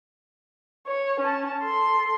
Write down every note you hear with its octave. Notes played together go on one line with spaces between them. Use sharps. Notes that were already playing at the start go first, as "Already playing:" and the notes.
C#5
C#4 A5
A4 C6